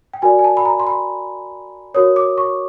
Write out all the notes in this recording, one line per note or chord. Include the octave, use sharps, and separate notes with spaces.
G5
F#4 A#4 D5 G#5
G#5
A5
B5
A#5
C6
B5
F#4 A#4 C#5 D#6
D6
C#6